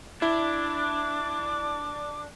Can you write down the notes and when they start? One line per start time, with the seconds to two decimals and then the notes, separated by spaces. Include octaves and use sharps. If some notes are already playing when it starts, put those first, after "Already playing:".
0.22 D4 E4 D6